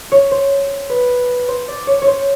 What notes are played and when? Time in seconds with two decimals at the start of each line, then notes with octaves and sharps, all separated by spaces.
0.12 C#5
0.31 C5
0.90 B4
1.48 C5
1.68 D5
1.87 C#5
2.02 C#5
2.07 C5